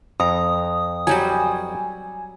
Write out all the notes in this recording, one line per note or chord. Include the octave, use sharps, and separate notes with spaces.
F2 A#5 D#6
F#3 G3 F#4 G#5